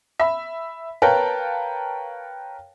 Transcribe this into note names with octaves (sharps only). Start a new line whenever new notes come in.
E5 B5
A#4 B4 C#5 F5 G5 A5